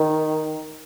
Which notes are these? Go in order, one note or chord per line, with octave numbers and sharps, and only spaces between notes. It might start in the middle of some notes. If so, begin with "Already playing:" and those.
Already playing: D#3